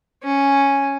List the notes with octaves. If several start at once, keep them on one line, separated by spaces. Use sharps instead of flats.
C#4